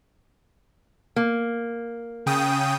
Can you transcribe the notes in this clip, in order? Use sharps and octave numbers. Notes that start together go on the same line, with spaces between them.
A#3
C#3 G5 D#6